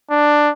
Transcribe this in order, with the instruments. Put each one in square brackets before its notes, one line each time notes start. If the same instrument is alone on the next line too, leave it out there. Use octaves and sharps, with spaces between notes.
[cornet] D4